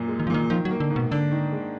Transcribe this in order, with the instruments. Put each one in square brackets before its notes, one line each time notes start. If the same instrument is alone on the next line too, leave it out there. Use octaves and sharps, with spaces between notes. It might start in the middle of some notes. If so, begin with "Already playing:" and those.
Already playing: [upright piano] F#2 A#2
G#3
[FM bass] D#3
F3
[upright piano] A#2 [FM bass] D#3
[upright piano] D#3 [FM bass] F3
[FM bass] F#3
[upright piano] A#3
[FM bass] D3
[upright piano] G#2
[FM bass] B2
[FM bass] D3 [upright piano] D4
[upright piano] D#3
G#3